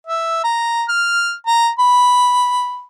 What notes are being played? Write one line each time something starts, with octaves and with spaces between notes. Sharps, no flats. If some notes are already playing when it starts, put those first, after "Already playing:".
E5
A#5
F6
A#5
B5